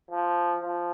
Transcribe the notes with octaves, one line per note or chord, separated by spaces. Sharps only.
F3
F3